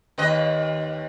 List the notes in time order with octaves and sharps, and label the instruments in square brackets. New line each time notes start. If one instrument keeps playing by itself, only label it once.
[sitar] D#2 B4 D#5